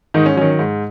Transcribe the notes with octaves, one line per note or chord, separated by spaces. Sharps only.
G#2 D#3 D#4
C#4
D#3 F#3 C#4
G#2